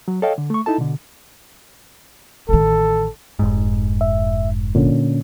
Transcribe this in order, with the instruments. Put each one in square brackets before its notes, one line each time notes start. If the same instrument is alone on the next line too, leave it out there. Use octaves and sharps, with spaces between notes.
[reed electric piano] F#3
A4 C#5 D#5 F5 G5
D3
A3 C#6
D#4 E4 A4 A5
B2 D3
[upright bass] A1 D#3 [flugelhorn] A4
[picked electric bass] F1 G#2
[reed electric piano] E5
A#2 D3 C#4